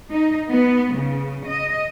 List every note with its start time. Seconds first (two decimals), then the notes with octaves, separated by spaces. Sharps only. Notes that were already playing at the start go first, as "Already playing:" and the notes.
0.11 D#4
0.50 B3
0.95 C#3
1.46 D#5